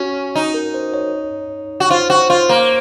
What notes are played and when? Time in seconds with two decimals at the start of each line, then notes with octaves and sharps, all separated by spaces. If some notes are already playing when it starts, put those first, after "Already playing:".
Already playing: C#4 F#4
0.35 D#4
0.54 A#4
0.74 C5
0.94 C#5
1.80 F#4
1.90 F4 C5
2.10 F#4 C5
2.30 F4 C5
2.49 A#3 C5